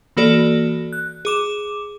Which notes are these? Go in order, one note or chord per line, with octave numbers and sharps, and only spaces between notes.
E3 A#3 F#4 A4 D5
F#6
G#4 D6 E7